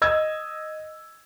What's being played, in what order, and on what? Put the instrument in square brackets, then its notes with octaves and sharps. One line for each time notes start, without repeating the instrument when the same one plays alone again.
[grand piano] D#5 E6 G#6